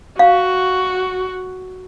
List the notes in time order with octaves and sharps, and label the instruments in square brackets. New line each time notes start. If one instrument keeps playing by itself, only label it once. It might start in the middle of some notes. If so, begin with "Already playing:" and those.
[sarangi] F#4 [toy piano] F5